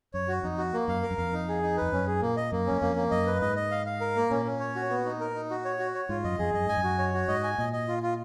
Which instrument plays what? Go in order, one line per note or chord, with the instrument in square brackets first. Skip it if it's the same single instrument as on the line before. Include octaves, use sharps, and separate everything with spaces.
[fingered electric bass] F#2 [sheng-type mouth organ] C#5
[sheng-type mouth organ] F#4
[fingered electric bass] F2 [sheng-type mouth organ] D#4
[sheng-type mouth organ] F#4
A#3
[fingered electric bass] F#2 [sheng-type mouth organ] F5
[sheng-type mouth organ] A#4
[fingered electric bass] F#2
[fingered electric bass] F2 [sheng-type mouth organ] F5
[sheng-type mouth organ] D#4
G#4
D#4
[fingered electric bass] F2 [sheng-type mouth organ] B4
[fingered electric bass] F#2 [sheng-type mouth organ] C#4
[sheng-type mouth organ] G#4
[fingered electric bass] A#2 [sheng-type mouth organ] A#3
[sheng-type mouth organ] D#5
[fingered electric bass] F#2 [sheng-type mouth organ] A#3
[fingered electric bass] F#2 [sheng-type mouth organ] C#4
[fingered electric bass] F2 [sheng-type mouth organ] A#3
[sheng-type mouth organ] A#3
[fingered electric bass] F#2 [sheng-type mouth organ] D#5
[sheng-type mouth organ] B4
[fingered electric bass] G#2 [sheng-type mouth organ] D#5
[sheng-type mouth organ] D#5
F5
F5
A#4
A#3
[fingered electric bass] A#2 [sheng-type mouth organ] C#4
[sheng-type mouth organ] C#4
C#5
F#4
B3
D#4
A#4
D#4
F#4
C#5
F#4
C#5
[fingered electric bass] G#2 [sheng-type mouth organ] F4
[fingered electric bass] F#2 [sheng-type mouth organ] D#5
[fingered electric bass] F2 [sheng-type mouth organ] G#4
[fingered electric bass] F#2 [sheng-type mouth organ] D#5
[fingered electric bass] G#2 [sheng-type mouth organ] G#5
[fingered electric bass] F#2
[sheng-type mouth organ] F#4
C#5
F#4
[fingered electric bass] G#2 [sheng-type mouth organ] D#5
[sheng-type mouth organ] G#5
[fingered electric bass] A#2 [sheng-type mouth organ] D#5
[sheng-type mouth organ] D#5
F4
F4